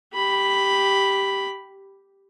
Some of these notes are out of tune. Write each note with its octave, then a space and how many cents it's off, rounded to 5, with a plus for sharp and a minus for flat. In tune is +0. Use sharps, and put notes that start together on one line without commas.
G4 +0 B5 +0